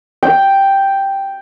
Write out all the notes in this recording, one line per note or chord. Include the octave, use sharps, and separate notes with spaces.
G5